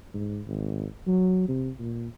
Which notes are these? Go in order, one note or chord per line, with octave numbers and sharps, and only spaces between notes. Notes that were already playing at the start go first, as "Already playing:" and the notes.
G#2
G#1
F#3
C3
A#2